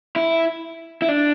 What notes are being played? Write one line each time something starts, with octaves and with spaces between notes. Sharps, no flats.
E4
E4
D4